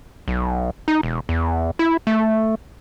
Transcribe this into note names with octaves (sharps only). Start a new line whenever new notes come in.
B1
D#4
E1
E2
E4
A3